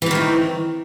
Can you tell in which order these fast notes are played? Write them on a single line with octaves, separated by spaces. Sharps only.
E3 C4 D#3 A2